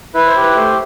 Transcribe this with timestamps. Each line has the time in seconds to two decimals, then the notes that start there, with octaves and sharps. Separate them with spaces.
0.14 E4 B4
0.27 C5
0.36 G4 B4
0.56 A3 C5